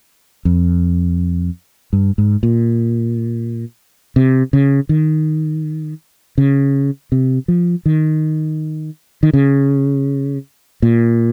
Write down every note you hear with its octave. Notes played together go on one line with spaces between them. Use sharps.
F2
G2
G#2
A#2
C3
C#3
D#3
C#3
C3
F3
D#3
D#3
C#3
A#2